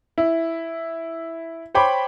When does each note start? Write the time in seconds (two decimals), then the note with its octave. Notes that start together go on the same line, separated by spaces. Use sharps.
0.18 E4
1.75 C5 C#5 G5 B5 D6